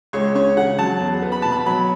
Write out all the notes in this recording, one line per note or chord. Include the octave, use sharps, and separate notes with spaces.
C#2 C#5
C#4 C#5
C#3 F#5
F#3 A5
E2
B3
B5
B2 A5
B5
F#3 B5